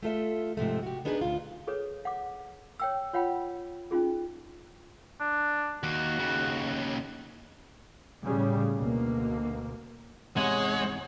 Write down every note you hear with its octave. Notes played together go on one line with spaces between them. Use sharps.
A3 F4 A4 E5
G#2 C3 F3 A3
F#4 G4
B3 D4 D#4 G#4 A#4 B4
D2 F4
G#4 A4 B4 C#5
F#5 D6
C#5 G5 E6
F4 C#5 F#5 G5 B5
C#4 D#4 F4 G#4
D4
D#2 F#4
D#2 C#3
A2 C#3 G3
D2 B2 A#3
E2 G#2 C3 G#3 C#5 F#5